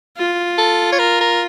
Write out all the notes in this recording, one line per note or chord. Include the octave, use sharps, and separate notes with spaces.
F4
A4
C#5
A#4
A#4